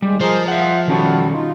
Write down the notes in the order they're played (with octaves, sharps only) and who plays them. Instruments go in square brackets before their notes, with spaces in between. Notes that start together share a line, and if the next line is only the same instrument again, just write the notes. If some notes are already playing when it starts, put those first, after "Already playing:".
[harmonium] D#2 G#3 [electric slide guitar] G3
[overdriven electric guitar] F3 [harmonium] G#4 A#4 D#5 [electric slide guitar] C5
[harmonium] F4 [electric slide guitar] E5 F#5
[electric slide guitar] D#3 C#4 C#5 [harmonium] G3 F#4 A4
[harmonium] D#4 F4